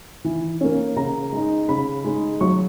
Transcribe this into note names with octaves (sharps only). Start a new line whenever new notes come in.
E3
A#3 C#4
C#3 A#5
G#3 D#4
C#3 B5
G#3 D#4
F#3 C#6